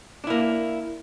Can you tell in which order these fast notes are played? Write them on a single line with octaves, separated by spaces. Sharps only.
D4 E4 A#3